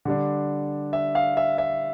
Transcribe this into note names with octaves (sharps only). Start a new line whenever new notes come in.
D3 G3 D4
E5
F5
E5
E5